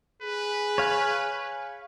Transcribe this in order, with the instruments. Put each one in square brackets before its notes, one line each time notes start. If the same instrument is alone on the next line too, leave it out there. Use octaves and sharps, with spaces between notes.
[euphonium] G#4 [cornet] B4
[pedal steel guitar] C#5 F5 G#5